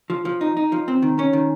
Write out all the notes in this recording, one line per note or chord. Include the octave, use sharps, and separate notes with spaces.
F3
F3
D#4
D#4
F3
C4
D#3
C#4
D#3